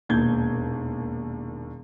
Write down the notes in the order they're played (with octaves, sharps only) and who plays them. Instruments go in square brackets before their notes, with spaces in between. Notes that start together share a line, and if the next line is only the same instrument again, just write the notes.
[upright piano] E1 D#2 A#2 G6 G#6 G7